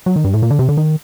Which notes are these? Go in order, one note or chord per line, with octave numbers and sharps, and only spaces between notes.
F#3
D#3
G2
A2
A#2
D3
C3
D3
D#3